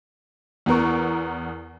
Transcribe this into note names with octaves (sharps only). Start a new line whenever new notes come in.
E2 E3 B3 A#4 C#6